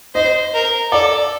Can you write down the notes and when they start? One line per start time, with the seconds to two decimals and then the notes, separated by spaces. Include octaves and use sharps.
0.15 C5 D#5
0.54 A#4
0.92 A4 D5